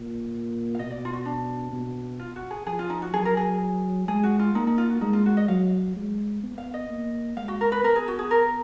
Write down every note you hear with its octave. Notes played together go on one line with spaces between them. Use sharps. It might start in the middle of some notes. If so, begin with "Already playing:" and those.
Already playing: A#2
F5
B2 D#5
D5
F4
F#4
D4
B2
F4
F#4
G#4
F3 G#4
F4
D#4
F#4
F#3 G#4
A#4
G#4
G#3 G#4
F#4
F4
A#3 D#4
D#4
F4
F#4
G#3 D#4
F4
F#4
D#5
F#3 F5
G#3
B3
F5
D#5
A#3
G#3 F5
F#4
A#4
B4
B3 A#4
G#4
F#4
G#4
A#4